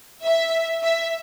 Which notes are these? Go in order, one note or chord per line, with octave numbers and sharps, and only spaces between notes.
E5
E5